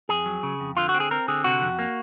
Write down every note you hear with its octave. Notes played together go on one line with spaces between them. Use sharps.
F2 G#4
F#3
C#3
F2
D3 F4
F#4
C4
G#4
C4 A#4
D3 G#4
C3 F#4
F2
A#3